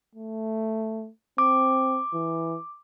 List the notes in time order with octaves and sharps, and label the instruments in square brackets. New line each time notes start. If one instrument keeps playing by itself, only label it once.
[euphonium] A3
[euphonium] C4 [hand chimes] D6
[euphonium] E3